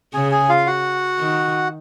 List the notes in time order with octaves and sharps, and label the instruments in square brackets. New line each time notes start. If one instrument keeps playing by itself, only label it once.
[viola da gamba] C#3 [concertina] G#4 G#5
[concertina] G#4 G#5
F4 F5
F#4 F#5
[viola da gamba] D#3